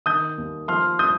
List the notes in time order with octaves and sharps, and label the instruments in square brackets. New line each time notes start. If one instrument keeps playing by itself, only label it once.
[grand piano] D#3 D#6 G6
D#2
F3 C6 F6
D#6 G6